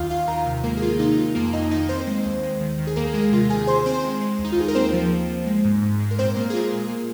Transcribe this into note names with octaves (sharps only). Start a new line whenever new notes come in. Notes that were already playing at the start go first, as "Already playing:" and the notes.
Already playing: D#2 D#3 F4 F5
D#2 F4 F5
D#3 A#4 A#5
C3
G#3 A#3 A#4
G#4
D#3 F4
C3 D#4
C3 F4
F2 A#3 A#4
F2 D#4 D#5
D#3 D#4 D#5
D#3 C4 C5
G#3
D#2
G#3
D#3
D#3
G#4
D#2 A#3 A#4
G#3 A#3 G#4
C3 F4
D#3 G#4 G#5
C3 C5 C6
D#3 C4 C5
G#3
G#3
D#2
D#4
F4
D#2 G#4
A#4
A#3 C4 C5
F3
A#3
F3
G#3
G#2
G#2
G#3
A#4
A#2 C4 C5
A#2 A#3 A#4
G#4
G#3 F4
A#2
A#3